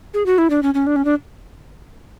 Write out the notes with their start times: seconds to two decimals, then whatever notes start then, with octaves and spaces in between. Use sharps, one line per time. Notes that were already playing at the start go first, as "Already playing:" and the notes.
0.14 G#4
0.26 F#4
0.38 E4
0.50 D4
0.63 C#4
0.74 C#4
0.87 D4
0.96 C#4
1.05 D4